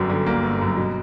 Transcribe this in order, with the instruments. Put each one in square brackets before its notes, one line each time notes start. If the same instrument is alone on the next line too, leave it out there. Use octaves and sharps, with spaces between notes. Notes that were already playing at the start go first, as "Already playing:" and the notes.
Already playing: [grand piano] G1 F#2
D3
G1 A#3
G1
F#2
B2